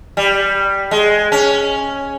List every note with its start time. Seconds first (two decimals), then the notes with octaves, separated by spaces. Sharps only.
0.17 G3
0.91 G#3
1.32 C#4